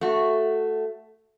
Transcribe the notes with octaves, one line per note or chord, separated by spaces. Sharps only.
A3 F#4